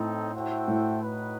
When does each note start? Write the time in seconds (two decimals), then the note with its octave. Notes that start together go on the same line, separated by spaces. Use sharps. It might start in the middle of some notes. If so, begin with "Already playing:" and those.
Already playing: A2 C4 D#4 A4
0.34 F#4 A4 C5 E5 G5
0.68 A2
1.02 D#4 F#4 B4